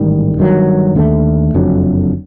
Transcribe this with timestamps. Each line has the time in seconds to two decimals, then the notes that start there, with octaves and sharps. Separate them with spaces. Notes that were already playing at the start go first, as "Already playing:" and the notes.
Already playing: A1 G#2 D#3 G3
0.38 G1 G2 D#3 F#3
0.95 D#2 D3 F#3 A3
1.54 F#1 F2 D3 F#3